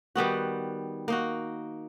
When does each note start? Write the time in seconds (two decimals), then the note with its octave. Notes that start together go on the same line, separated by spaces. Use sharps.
0.15 D#3 G3 B3 F#4
1.08 A#3 D#4 F#4